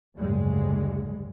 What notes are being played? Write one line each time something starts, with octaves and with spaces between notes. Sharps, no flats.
F#1 D2 G#2 C#3 G3 G#3